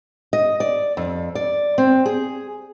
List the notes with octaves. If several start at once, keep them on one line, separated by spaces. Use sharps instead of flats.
D#5
D5
F2
D5
C4
G#4